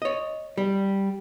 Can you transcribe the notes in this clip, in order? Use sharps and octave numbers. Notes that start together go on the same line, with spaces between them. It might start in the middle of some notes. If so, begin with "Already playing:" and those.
C#5 D#5
G3